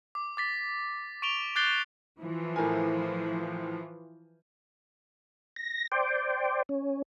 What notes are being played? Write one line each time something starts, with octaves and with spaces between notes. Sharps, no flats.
D6
D6 A6 B6
C#6 D7 F7 G7
D6 F#6 G6 A6 C7 G7
E3 F3
A2 A#4 G#5
A#6
C5 D5 G5
C#4